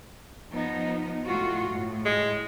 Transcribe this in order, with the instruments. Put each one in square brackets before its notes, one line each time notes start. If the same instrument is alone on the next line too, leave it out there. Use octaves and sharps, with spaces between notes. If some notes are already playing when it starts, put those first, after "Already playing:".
[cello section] F3 B3 D#4
A2 F4 F#4
A2
[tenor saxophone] G#3